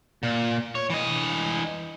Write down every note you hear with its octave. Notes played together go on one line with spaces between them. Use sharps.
A#2
C#5
E3 D#5